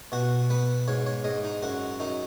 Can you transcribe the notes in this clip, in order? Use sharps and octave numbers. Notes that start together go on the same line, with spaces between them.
B2 F#4
B3 B4
G#2 C#5
C#5
G#2 D#5
D#4
F#2 F#4
F#2 D#4